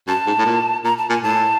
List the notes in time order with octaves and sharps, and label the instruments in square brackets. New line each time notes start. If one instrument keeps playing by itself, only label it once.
[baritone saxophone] F#2 [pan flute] A5
[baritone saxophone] G#2
A2
A#2
[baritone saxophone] A#2 [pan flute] A#5
[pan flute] A5
[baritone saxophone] A#2 [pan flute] G#5
[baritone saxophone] A2 [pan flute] A5